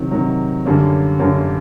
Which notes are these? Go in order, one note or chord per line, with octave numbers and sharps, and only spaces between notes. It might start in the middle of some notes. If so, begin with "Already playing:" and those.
Already playing: C3 D#3 F#3
C3 D#3 F#3
F#2 D3 G3 A#3 C#4
F#2 D3 G3 A#3 C#4